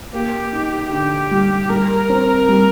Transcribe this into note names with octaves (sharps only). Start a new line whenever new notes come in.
A#3 G4
D#4
D3 G4
G3
G3 A#4
C4
G3